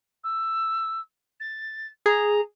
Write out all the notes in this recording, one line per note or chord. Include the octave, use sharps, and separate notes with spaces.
E6
A6
G#4 A#5